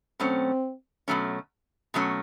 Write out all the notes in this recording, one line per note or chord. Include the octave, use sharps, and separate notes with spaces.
B2 F#3 A3 C4 C#4
B2 F#3 A3 C#4
B2 F#3 A3 C#4